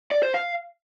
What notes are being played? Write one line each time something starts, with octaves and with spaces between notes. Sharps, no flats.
D5
C5
F5